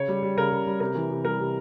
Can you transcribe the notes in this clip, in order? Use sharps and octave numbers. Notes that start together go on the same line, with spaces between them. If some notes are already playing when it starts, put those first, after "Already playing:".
Already playing: C#3 C#5
G3
G3
C#3 A#4
C#3
G3
C3 A#4
E3
C3
G3 A#4
C3